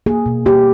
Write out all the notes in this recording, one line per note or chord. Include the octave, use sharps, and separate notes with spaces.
A#3 G#4
B2
A#3 G4